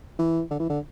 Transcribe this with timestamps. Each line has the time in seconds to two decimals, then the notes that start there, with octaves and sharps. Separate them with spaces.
0.19 E3
0.50 D3
0.60 E3
0.70 D3